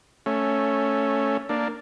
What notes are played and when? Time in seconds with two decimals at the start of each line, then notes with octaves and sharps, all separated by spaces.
0.26 A3 C#4
1.49 A#3 D4